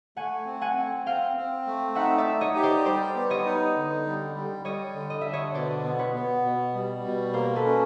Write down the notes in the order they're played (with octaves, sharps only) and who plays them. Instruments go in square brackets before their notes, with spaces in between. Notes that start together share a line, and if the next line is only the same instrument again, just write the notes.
[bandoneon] A3 [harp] F#5 G#5
[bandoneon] C4
[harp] F#5 G#5
[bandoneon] C4
[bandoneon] C4 [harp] F5 G5
[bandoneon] C4
A3
[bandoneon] D#4 [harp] E5 F#5
[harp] D5 E5
[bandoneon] D#4
[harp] C#5 D#5
[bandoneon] G4
[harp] C5 D5
[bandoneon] G3 [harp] C5 D5
[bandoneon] B3
[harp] C#5 D#5
[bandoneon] D#4
D3
G3
G3
[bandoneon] G3 [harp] C#5 D#5
[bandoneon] D3
[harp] D#5
[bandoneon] D3 [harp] E5
[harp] C#5 D#5
[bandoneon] B2 [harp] C5 D5
[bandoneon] B3
[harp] B4 C#5
[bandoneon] B3
B2
G3
B2
[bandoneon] A#3 [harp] A#4 C5
[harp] A4 B4
[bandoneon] C#4